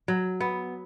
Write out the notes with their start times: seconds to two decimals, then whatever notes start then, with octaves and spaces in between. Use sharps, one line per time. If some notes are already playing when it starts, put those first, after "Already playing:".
0.08 F#3
0.40 B3